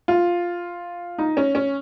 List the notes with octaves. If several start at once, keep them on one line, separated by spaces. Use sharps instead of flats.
F4
D#4
C#4
C#4